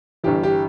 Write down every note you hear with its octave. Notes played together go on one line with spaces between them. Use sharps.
G1 G2 E3 G4
G4